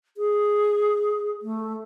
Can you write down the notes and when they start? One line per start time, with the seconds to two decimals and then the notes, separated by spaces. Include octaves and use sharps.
0.17 G#4
1.42 A3